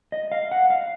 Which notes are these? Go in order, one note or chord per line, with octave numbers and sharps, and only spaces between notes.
D#5
F5
F#5
F5